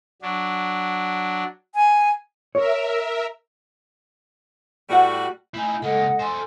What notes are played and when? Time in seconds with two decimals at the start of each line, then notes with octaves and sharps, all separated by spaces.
0.22 F#3 D4
1.75 G#5
2.55 A#4 C#5 E5
4.89 A2 G3 F#4 B4 D5 F#5
5.54 A3 D#4 E4 G#5
5.82 C#3 G#3 A#3 A4 D#5 F#5
6.19 A4 C5 G#5 C6